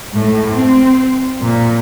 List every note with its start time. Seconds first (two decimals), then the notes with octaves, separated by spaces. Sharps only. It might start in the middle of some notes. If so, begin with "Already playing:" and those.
0.14 A2
0.51 C4
1.41 A#2